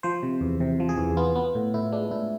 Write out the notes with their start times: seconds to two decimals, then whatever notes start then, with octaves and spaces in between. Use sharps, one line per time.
0.03 F3 C5
0.23 C3
0.41 E2
0.60 C3
0.80 F3
0.89 G#4
0.98 E2
1.17 B3 F4
1.35 B3
1.55 A2
1.74 A2 E4
1.92 G#3 D4
2.11 A2 E4